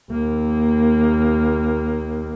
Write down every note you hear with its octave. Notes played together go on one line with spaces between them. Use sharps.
D#2 A#3